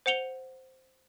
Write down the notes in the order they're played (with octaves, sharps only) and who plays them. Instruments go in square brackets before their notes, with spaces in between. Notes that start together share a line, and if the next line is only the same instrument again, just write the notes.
[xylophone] C5 F#5 C#7 F7 G7